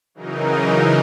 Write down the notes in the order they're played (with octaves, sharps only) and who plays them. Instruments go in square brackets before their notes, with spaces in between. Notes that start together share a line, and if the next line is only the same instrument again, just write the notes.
[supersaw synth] C#3 E3 F#3 D#4 A#4